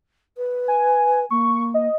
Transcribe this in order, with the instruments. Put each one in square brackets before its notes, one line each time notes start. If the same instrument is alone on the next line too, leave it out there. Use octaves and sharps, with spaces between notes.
[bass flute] B4
[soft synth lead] G#5
[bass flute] A#3 [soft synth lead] C#6
[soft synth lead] D#5